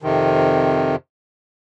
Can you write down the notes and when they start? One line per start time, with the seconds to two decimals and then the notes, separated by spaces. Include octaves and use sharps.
0.02 F2 C3 D#3